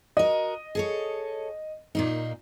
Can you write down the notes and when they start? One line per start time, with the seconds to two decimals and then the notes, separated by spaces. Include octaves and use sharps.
0.17 F#4 A#4 D#5
0.75 G#4 A4 C#5
1.95 A#2 A#3 D#4